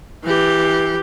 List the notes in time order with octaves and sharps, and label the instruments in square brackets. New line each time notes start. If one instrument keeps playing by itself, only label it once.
[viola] E3 G4